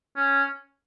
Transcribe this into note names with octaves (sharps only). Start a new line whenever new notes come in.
C#4